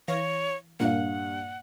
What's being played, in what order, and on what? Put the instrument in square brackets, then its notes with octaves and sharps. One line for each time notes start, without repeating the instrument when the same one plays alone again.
[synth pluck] E3 F5 A#6 [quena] C#5
[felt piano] G2 F5 [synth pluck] A#2 A#3 [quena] F#5